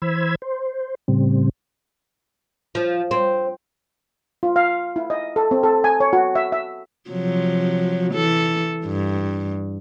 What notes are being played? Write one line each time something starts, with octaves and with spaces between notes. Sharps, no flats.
E3 C5 B5 E6 G#6
C5
A2 C#3 G3 C4
F3
C4
F4
F5
E4
D#5
A4
C4
A4
G#5
C#5
F#4
E5
E5
C3 F3 F#3
E3 A4
G2